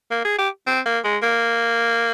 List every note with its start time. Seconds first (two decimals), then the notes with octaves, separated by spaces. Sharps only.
0.11 A#3
0.25 G#4
0.38 G4
0.67 C4
0.86 A#3
1.05 G#3
1.23 A#3